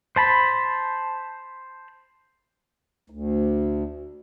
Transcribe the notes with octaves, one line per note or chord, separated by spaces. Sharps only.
C5 A5 B5
D2